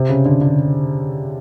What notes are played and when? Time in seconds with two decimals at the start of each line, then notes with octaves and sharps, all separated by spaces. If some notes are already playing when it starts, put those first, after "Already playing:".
Already playing: C3
0.09 C#3
0.26 D3
0.41 D3